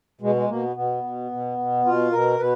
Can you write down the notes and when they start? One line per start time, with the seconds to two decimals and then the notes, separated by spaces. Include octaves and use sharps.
0.21 B2 G#3
0.35 G#3
0.49 B2 A#3
0.63 B3
0.76 B2 B3
1.03 B2
1.31 B2
1.58 B2
1.85 B2 F4
2.12 B2 A#4
2.39 B2 B4